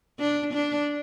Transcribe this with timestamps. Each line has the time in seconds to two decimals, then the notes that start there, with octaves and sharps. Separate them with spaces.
0.19 D4
0.53 D4